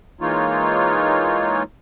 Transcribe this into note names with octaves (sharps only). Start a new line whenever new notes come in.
E3 G#3 A#3 D#4 F4 C#5